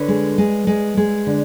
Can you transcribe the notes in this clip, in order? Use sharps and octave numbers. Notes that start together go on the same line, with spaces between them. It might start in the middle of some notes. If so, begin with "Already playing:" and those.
Already playing: D3 B4 C#5
G#3
G#3
G#3
G#3
D3